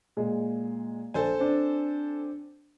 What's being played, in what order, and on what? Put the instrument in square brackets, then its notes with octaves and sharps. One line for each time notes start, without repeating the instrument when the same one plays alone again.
[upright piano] A#2 G#3
[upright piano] A#1 [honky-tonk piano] A4 C5 G#5
[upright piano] C4 D4